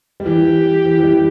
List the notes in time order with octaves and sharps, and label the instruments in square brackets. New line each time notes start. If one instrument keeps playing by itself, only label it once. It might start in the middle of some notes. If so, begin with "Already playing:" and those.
[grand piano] G3
[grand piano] E3 [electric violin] G4
[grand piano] E3
E3
G3